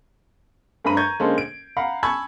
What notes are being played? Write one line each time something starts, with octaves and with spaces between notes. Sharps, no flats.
G2 A3 C4 A#5 B5 D#7
A#5 C#6 G6 G#6
D3 G#3 A#3 C#4 A4 C5
D7
F5 F#5 A#5 B5
G#5 A5 B5 C#6 E6 G#6